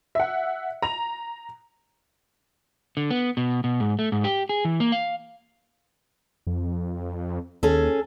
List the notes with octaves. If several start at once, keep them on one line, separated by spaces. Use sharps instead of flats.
E5 F#5
A#5 F7
D3
B3
B2
B2
G#2
A3
G#2
G4
G#4
E3
A#3
F5
F2
D#2 C#4 G#4 A4